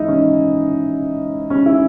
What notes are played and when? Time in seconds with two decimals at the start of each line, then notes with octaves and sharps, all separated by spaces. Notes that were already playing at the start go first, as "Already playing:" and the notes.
Already playing: G#2 E3 D#4 E4
0.08 C#4
1.50 C#4
1.66 E4